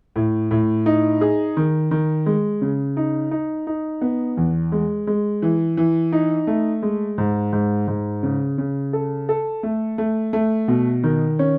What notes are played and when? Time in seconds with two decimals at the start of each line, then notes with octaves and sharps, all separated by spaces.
0.16 A2
0.51 A2
0.86 D#4
1.21 G#4
1.57 D#3
1.91 D#3
2.26 G#3
2.61 C#3
2.97 D#4
3.31 D#4
3.67 D#4
4.01 B3
4.37 E2
4.72 G#3
5.07 G#3
5.42 E3
5.77 E3
6.12 D#4
6.47 A3
6.83 G#3
7.18 G#2
7.53 G#2
7.88 G#2
8.23 C#3
8.58 C#3
8.93 A4
9.29 A4
9.63 A3
9.98 A3
10.33 A3
10.68 B2
11.03 D#3
11.39 C#4